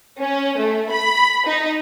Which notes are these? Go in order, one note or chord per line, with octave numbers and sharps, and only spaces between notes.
C#4
A3
B5
D#4